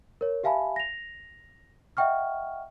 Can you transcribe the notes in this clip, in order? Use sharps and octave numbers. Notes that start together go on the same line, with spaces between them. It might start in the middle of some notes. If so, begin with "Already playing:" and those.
A#4 C#5
G4 E5 F5 G#5 A5 B5
A#6 F7
D#5 E5 F#5 G5 C#6 F6